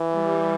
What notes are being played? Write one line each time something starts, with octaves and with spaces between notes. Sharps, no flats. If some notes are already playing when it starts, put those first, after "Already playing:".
Already playing: E3
G3